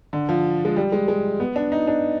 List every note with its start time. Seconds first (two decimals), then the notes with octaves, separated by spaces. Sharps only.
0.13 D3
0.29 F3
0.65 G#3
0.76 G3
0.92 G#3
1.08 G#3
1.40 B3
1.56 D4
1.72 D#4
1.87 D4